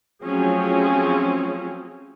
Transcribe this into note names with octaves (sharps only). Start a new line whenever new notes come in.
F3 F#3 A3 C4 C#4 G#4